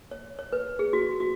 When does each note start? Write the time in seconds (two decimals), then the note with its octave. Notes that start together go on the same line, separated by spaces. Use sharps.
0.11 C#5
0.39 C#5
0.53 B4
0.79 G#4
0.93 F#4
1.20 F#4